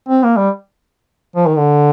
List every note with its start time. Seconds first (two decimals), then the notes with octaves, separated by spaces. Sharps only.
0.09 C4
0.23 A#3
0.37 G3
1.35 F3
1.47 D#3
1.57 D3